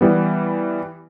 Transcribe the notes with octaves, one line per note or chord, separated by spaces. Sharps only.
E3 G3 B3